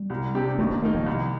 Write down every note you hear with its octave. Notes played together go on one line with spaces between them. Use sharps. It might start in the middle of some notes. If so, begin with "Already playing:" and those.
Already playing: G3
C2
C3 G3 D4 G4
D#2 A3
A#3
D#3 A3 A#3 D#4
F3
C2